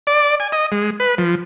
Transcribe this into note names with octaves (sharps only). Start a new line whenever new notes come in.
D5
G#5
D#5
G#3
B4
F3